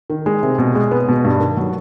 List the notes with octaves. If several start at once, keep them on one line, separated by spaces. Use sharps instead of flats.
D#3
G#3
C3
B2
G#3
B3
B2
G2
D#3
F#3